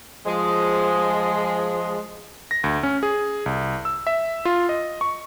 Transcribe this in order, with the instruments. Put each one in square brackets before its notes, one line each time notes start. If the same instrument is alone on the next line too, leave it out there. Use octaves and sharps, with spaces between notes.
[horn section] F3 G#3
[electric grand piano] A#6
D2
C#4
G#4
C2
E6
E5
F4
D#5
C#6